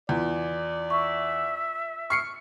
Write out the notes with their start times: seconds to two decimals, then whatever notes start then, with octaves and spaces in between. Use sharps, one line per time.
0.09 E2 F4 D5
0.90 E5 C#6
2.10 C#6 F6 C7 C#7